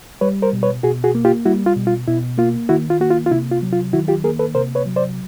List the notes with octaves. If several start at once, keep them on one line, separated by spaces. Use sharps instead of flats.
G3 B4 C#5
A#4 C5
B2
B4 C#5
B2 F#4 G#4
F#4 G#4
A#3
F4 G4
G3 E4 F#4
F4
B2
F4
B2 E4
A#3 F4
D#3 E4 F#4
F4
A#3 F#4
F4
F4
C3 E4
F4
F#3
F4
D#3 E4 F#4
F4 G4
A#3 G#4 A#4
A4 B4
C3 A#4 C5
B4 C#5
F#3
C5 D5